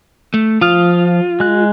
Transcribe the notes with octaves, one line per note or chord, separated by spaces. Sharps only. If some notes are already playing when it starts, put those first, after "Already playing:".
A3
F3 F4 D#6 F6
G#3 F#6